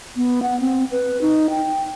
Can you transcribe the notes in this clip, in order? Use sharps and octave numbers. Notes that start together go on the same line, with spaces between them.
B3
F#5
C4
B4
D#4
G5